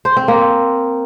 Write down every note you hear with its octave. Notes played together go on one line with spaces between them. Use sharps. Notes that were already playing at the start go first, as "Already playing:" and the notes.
C5
C4
A#3